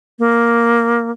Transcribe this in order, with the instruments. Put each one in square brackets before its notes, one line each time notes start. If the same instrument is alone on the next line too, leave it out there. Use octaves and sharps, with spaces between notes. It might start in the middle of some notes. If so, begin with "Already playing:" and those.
[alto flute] A#3